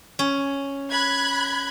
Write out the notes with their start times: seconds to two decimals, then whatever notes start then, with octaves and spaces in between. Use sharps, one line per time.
0.19 C#4
0.90 B5 F#6 G#6